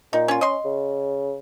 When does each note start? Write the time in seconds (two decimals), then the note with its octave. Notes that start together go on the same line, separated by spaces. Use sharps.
0.13 A#2 D#4
0.28 C#4 F4
0.41 C#4 D#5 C6
0.65 C#3